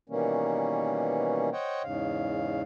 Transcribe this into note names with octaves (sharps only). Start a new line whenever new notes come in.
B2 D#3 E3 G3 A#3 C#4
C5 C#5 D#5 F#5 G5
E2 G#2 C#3 F5